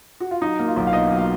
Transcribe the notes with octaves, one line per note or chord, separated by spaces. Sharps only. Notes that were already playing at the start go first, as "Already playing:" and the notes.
F#4
F4
F#3 D#4
A#3
F4
B1
F5
B2 D#4 D#5
F#3
F4 F5